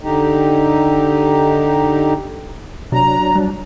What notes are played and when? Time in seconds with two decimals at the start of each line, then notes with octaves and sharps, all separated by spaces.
0.01 D3 D#4 G4
2.92 C3 F#3 D4 A#5
3.36 G3